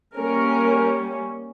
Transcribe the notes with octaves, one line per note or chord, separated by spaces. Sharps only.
G3 A#3 C#4 A#4